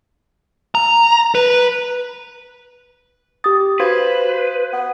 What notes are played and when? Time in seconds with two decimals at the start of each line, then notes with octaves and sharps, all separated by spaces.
0.75 A#5
1.35 B4
3.44 G4 D#6 A6
3.80 F#4 B4 C5 F5 G#6
4.73 B3